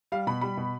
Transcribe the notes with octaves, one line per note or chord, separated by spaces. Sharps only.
G3 F5
B2 B5
G3 B5
B2